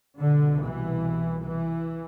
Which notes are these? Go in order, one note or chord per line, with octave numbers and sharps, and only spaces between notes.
C2 B2 D3
E3
E3